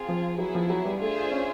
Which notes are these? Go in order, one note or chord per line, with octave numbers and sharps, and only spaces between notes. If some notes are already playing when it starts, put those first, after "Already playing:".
Already playing: C4 F4 G#4
F3
F#3 B3 E4 G#4
F3
F#3
G3
A3 D4 F4 G#4 C5 E5
C#4